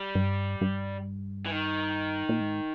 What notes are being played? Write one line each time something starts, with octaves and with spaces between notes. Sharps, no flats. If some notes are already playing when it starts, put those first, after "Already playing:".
Already playing: G3
G2
G2
E3
D#3
A#2
G#2